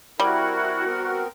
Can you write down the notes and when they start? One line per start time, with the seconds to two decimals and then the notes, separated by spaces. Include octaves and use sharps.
0.20 G3 C4 E4 F#4 A#4
0.86 B3 C4 A#4